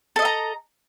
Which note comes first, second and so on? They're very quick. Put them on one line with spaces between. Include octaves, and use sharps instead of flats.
A4 D#5 E5 A#5